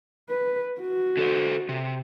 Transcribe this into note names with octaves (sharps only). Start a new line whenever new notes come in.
B4
F#4
D3 A4 C5
C3